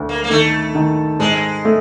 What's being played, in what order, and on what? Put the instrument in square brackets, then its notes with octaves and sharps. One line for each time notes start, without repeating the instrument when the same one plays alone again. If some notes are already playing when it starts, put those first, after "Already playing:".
Already playing: [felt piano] D2
[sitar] A#3
A#3
[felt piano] D#3 [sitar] A3
[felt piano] D#3
[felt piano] G#2 [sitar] G#3
[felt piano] A3